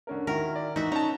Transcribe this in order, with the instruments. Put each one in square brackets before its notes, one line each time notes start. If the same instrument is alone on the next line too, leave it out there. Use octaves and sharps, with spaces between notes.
[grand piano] D3 C#4 A#4
[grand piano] D#3 E4 F#4 [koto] A#4
[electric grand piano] D5
[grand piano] E3 [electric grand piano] D#4 [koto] F#4 E5
[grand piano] C#4 [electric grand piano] D#4 A5 [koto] A#5